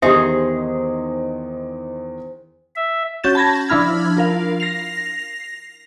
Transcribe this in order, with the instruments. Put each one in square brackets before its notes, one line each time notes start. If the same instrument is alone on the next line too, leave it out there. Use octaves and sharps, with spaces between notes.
[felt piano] E2 D#3 [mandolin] D#4 G#4 [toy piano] G4 E5 [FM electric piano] C5
[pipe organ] E5
[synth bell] C#4 F#4 G6 A6 E7
A5 B5 G#6 A#6
F3 D4 E4 B5 F6 G#6
F4 A#4 F5
A#6 C7 F7